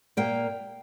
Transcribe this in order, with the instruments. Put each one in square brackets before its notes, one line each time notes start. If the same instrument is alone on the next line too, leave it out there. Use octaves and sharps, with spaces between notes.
[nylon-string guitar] A#2 A#3 G5